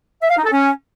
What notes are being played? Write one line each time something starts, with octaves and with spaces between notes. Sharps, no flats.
E5
F5
D#4
A4
C#4